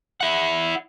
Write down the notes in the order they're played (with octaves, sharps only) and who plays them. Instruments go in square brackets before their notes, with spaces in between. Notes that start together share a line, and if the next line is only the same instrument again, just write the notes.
[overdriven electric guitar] E4 F#5